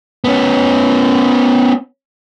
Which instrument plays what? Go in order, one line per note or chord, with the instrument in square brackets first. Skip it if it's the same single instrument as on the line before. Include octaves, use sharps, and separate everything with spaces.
[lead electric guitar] B3 C#4